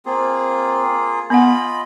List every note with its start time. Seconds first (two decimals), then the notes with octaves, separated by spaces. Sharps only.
0.06 A#3 C4 F4 G#4
1.30 B3 F4 D#5 F#5 B5